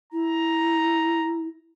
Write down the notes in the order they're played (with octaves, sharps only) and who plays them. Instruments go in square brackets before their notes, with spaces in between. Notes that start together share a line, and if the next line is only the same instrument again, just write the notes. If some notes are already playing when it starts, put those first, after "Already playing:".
[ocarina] E4 [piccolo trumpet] A#5